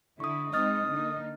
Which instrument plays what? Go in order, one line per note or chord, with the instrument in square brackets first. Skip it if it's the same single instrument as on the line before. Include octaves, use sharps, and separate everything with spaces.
[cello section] D3 E4 [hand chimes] C#6 D#6
[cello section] G#3 C4 D#4 [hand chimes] D#5 F6 A6 [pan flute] D#6
[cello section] D3 A#3 D#4